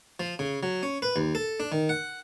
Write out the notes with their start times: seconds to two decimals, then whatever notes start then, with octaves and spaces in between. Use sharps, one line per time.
0.20 F3
0.39 C#3
0.63 F#3
0.83 C#4
1.02 B4
1.16 D#2
1.35 A4
1.60 D4
1.72 D#3
1.89 F#5